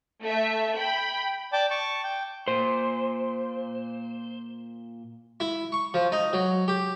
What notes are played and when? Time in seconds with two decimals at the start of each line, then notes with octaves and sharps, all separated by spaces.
0.22 A3 E5
0.76 G5 B5
1.53 D5 G5 A5 D6
1.70 A5 C#6 D6
2.04 G5
2.48 A#2 C5
5.40 E4
5.72 C#6
5.94 F3
6.12 D#4
6.33 F#3
6.68 G4